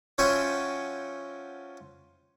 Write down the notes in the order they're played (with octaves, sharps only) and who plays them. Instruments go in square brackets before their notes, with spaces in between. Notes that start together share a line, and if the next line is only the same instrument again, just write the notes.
[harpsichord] F3 C#4 F#4 E5 G5 G#5